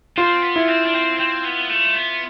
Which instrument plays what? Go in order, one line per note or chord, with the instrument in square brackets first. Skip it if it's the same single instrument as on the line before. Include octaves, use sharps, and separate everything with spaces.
[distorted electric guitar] C4 [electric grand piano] F4
[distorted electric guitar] B3
[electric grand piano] E4
[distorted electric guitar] C4
D4
C4
C4
B3
A3
B3